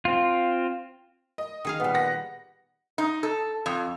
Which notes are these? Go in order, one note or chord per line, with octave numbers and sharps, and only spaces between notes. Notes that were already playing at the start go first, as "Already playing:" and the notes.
C4 F4
D#5
D#3 G#4 F5
A#2 G3 B3
F#5 A#6
D#4
A4
F2